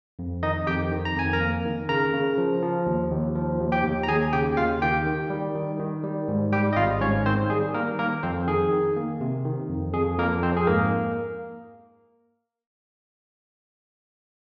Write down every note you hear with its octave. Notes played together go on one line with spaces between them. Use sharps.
F2
D#3 D#4 D#5
F2 G4 G5
D#3
A#5
F2 G#5
A#4 A#5
A#3
D#3
C#3 A#4 A#5
C#3
F3
F3
D#2
D#2
F3
D#2
G4 G5
D#2
A#5
D#2 G#4 G#5
C#3 G4 G5
D#2 F4 F5
D#3 G4 G5
D#3
G3
D#3
D#3
G3
G#2
G3 G4 G5
D#5
G#1 F4 F5
G#2 C#4 C#5
D#3 C4 C5
G3 G#4
D#3 A#3 A#4
A#3 A#4
F2 C4 C5
D#3 G#4
D#3
A#3
C3
D#3
F2
F2 G#4
F2 A#3 A#4
F2 C4 C5
G#4
G#2 A#3 A#4